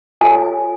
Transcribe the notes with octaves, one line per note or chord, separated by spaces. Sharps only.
F4 A4 C#5 G#5